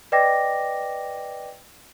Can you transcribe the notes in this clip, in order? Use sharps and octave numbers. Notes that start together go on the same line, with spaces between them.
B4 D5 D#5 G5 D6 A#6